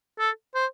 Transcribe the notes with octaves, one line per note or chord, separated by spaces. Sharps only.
A4
C5